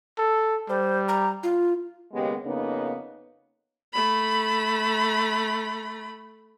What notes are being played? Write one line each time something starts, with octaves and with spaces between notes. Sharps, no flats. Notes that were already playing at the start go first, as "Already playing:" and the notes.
A4
G3 C5
A#5
F4
D#2 C#3 G#3 B3 G4
F2 C#3 A#3 B3 D#4
A3 B5